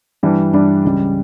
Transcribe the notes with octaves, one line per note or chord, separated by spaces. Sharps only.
G2 E3 G3 D4
G2 E3 G3 D4
C#2 C#3 G3